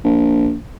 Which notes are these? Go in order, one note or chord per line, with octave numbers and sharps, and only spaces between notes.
A#1